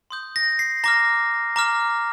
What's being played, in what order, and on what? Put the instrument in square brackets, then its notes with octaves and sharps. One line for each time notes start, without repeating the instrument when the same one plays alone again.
[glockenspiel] C6 D#6 G6
A#6
C7
A#5 D6 F6 A#6
A#5 D6 F6